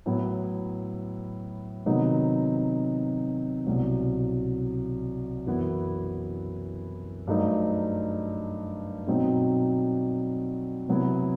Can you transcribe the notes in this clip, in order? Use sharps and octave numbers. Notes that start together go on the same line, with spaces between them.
A2 F#3 B3 E4
C3 D#3 F#3 B3 D#4
C2 B2 F#3
F#2 E3 B3 E4
G2 F#3 A3 D#4
B2 F#3 C4 D#4
C3 F#3 B3 E4